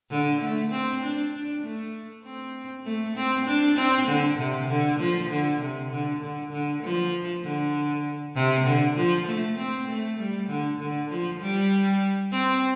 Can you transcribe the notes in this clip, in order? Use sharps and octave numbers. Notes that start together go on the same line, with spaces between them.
D3
A3
C4
D4
D4
A3
C4
A3
C4
D4
C4
D3
C3
D3
F3
D3
C3
D3
D3
D3
F3
D3
C3
D3
F3
A3
C4
A3
G3
D3
D3
F3
G3
C4